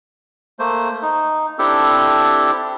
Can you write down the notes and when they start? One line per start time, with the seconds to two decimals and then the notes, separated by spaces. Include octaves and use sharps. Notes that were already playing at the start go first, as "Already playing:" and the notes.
0.59 A3 A#3 C5
1.02 D#4
1.59 C4 D4 E4 G4 A4